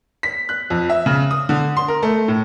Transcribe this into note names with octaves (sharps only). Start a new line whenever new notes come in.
B6
F#6
F2
E5
C#3
D#6
D3
C6
A#4
A3
A2